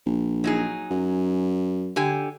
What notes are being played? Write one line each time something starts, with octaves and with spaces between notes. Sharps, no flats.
A#1
F#3 D#4 G#4
F#2
D3 G4 G#5